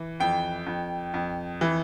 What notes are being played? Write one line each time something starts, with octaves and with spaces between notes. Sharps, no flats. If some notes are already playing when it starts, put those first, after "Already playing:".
Already playing: E3
F2 G5
F2
F2
E3